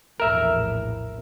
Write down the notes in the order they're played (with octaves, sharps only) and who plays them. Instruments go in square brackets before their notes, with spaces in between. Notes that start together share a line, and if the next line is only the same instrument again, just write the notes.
[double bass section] A#1 E2 A2 [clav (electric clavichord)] A#4 E5